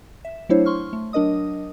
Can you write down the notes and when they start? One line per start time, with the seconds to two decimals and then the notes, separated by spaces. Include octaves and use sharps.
0.25 E5
0.49 F#3 A3 D4 E4 C5 C#5
0.66 C6 C#6 F6
0.93 A3
1.13 F#3 D4 A#4 D#5 D#6